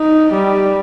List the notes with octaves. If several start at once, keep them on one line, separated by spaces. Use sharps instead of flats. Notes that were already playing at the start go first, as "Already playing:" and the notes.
Already playing: D#4
G3